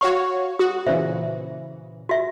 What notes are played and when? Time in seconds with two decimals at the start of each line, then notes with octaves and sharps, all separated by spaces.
0.01 F#4 C#5 F5 C#6
0.59 F#4 D#6
0.87 A#2 C#3 E3 C5 E5
2.09 F#4 E5